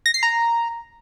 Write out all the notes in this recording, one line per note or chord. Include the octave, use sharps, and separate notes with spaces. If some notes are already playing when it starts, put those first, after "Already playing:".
A#6
C7
A#5